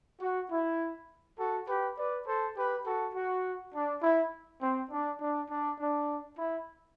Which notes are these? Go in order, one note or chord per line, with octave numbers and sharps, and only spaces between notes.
F#4
E4
F#4 A4
G4 B4
B4 D5
A4 C5
G4 B4
F#4 A4
F#4
D4
E4
C4
D4
D4
D4
D4
E4